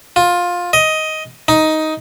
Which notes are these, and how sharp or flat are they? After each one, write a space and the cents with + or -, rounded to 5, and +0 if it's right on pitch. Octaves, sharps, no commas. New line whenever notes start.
F4 +15
D#5 +10
D#4 +10